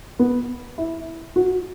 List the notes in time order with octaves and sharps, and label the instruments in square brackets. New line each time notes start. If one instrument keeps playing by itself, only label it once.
[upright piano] B3
E4
F#4